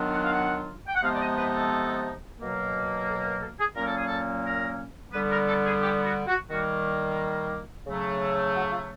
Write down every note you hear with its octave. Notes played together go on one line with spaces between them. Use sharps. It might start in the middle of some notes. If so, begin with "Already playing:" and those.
Already playing: D#3 F#3 B3 D4 F4
F#5
F5
F#5
G5
F#5
C3 F3 G#3 B3 D#4 F5
D5
D#5
B4
A4
B2 F#3 A#3
A4
A#4
A4
G#4
A#2 F#3 A#3 C#4 A#4
A4
G#4
A4
A#4
D3 G3 B3 B4
A#4
A4
G#4
G4
F#4
F#4
D#3 G3 A#3 F#4
C#3 F#3 A3
F#4
F4